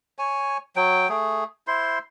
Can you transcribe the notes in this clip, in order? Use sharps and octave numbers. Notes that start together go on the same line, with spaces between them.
C#5 G#5
F#3 G5
A3 G#4
E4 C5 C6